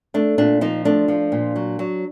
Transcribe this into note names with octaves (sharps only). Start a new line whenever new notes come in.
A3 D4
A#2 D4
F3 D#4
A3 D4
F3
A#2
F#3
F#3